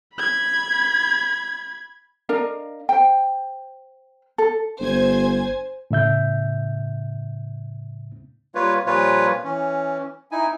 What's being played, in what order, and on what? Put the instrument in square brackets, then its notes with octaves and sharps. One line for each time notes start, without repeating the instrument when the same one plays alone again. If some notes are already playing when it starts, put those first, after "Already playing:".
[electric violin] B5 G#6
[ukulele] D4 A#4 D#5 F5
C5 G5
A4
[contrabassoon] G1 [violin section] C5 G#5 G#6
[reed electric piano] A2 C#3 E5 G6
[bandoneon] G3 A#3 F4 B4 C#5
A#2 F3 G3 F4 B4 C#5
E3 C#4
D#4 E4 G#5